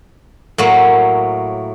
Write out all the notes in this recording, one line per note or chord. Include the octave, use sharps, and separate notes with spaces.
A2 F#3 A#3